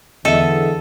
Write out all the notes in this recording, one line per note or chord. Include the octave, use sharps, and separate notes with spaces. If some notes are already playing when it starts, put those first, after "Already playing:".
E2 D3 A4 D#5 E5